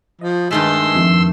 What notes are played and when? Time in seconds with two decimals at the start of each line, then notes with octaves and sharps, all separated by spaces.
0.21 F3 D#5
0.51 G2 D#3 G#3 A3 C6 E6
0.95 F2 E5